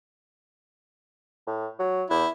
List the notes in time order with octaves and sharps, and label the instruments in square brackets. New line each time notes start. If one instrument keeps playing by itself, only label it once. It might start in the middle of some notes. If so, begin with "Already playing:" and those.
[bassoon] A2
F#3
[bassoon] E2 [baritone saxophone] E4